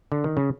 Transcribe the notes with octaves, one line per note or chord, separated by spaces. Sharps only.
D3
D#3
C#3